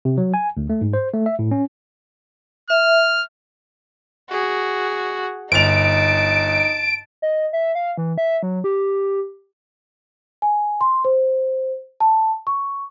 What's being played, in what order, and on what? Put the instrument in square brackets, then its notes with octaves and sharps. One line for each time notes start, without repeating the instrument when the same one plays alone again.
[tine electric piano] C3
F#3
G#5
D2
A3
G#2
C5
A3
E5
A2
C#4
[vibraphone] E5 [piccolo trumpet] F6
[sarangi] F#4 [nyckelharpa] G#4
[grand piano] G1 F7 [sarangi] D#4 [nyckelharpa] A5 [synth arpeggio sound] D7
[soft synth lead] D#5
E5
F5
E3
E5
F#3
G4
[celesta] G#5
C6
C5
A5
C#6